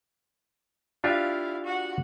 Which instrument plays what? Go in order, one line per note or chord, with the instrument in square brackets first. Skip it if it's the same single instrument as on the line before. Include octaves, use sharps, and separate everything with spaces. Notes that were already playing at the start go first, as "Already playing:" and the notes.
[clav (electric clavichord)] D4 F4 G4 [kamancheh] E4 F5
[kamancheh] F#4 F#5